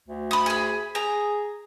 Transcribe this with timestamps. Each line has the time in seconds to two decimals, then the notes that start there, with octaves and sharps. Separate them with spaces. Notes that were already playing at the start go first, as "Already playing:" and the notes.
0.08 D2
0.31 B5 D#6
0.46 G#4 B5
0.95 G#4 A#5